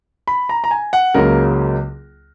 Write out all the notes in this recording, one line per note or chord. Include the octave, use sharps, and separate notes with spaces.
B5
A#5
A#5
G#5
F#5
C#2 C#3 F#3 A#3 A#4